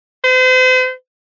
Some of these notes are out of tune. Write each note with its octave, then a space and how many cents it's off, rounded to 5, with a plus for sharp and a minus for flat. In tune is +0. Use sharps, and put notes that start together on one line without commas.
C5 -40